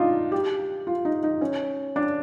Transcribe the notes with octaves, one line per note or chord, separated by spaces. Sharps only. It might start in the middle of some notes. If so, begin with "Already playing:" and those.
Already playing: D4 D#4 F4
G4
F4
D#4
D#4
C#4
D4